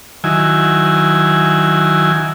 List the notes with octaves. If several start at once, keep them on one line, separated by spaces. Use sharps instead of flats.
D#3 F#3 E4 G#5